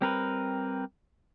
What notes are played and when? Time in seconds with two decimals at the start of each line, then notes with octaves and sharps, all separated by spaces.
0.01 G3 C4 A#4 B4